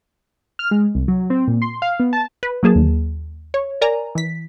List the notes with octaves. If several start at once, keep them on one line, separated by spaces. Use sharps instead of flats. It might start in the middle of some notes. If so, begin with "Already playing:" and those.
F6
G#3
C2
F#3
C4
A#2
C6
F5
B3
A5
B4
F#3 A#3 G#4 A5
D#2
C#5
A#4 D5 G#5 A#5
E3 B6